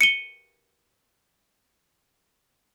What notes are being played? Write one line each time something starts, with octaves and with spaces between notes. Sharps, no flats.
C#7 D#7 G7